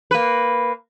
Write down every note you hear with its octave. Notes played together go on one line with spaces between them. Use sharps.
A#3 B4